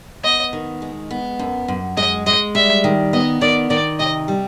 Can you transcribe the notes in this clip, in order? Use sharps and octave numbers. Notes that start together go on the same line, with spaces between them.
B3 D#5
D#3
G#3
B3
F#2
F#2
G#3 D#5
G#3 D#5
G3 E5
D#3
B3 D#5
D#3 D5
D#3 D5
C3 D#5
G3